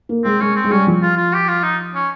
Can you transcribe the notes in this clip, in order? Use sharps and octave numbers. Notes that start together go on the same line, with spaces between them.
A#3
G#3 C4
G#3 C#4
C4
G#3
G3 C#4
F3
F4
F4
G4
F4
D#4
C#4